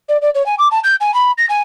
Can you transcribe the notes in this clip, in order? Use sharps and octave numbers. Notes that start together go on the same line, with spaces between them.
D5
D5
C#5
G#5
D6
A5
G6
G#5
B5
A#6
G#5